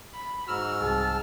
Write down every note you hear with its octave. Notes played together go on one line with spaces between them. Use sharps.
B5
G#2 F#4 E6 F6
C2 G#4 A5